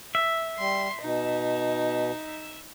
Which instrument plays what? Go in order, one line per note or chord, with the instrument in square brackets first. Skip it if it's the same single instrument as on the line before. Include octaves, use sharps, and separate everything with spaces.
[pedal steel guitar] E5
[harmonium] G3 [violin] C6
[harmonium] B2 [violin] D#4